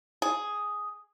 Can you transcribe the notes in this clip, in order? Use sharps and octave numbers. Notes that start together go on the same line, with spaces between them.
G#4